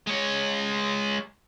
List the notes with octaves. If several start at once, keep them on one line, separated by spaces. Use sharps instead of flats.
G#3 C#5